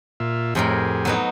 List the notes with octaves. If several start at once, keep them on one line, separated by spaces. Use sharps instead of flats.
A#2 F4 E5
F2 A2 G4 G#4 A#4
F#3 B3 D#4